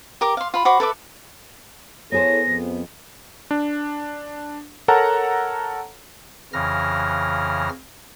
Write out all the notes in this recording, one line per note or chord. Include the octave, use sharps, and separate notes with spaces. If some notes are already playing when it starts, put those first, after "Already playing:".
G4 A#4 D6
F5 C6
F4 B5
F#4 C5 B5 D6
A4 B4 E5 D6
B3 E4 G#4 A4 C5 C#5 A#6
F2
D4
A4 A#4 C#5 F#5 A5 A#5
F2 C#3 E3 F6 A#6